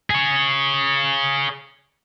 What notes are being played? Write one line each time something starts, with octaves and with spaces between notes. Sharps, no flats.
G#4 C#5